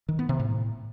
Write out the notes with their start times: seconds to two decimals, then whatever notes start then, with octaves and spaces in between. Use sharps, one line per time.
0.09 D#3
0.19 B3
0.29 C3
0.39 A2